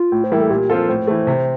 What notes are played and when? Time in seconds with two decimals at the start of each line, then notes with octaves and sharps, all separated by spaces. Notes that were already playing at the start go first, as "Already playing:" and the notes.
Already playing: F4
0.12 A2
0.24 C5
0.31 E3 G3 A#3 E4 A#4
0.42 A4
0.50 A#2 G4
0.70 F3 C4 F4 A4 A#4
0.89 A2 C5
1.07 E3 A3
1.27 C3